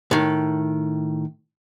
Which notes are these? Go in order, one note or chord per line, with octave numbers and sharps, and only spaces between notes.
A2 D#3